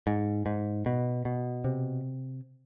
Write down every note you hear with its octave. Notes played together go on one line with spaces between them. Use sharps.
G#2
G#2
B2
B2
C3